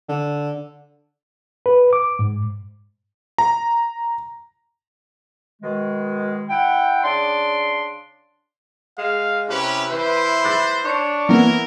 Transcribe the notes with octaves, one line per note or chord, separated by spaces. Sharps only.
D3
B4
D6
G#2
A#5
B2 D#3 G#3
E4 F#5 G5
C#3 D4 D5 C6
G#3 F5
C3 C#4 E4 G4 B4
E3 B4 C5
D6 F#6 A6
D4 C#5
E3 A#3 B3 E4 A#4